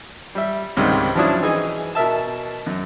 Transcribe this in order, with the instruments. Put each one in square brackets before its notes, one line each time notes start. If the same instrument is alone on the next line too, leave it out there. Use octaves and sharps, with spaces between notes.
[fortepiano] G3 E5
C#2 G#2 C3 D#3 G3 G#3
F3 F#3 C#4 D4 E4 D#6
E3 D#4 G#4 G#5
B2 A#4 E5 A5
F#2